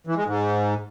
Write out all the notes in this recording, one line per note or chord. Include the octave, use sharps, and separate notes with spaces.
E3
G#3
G#2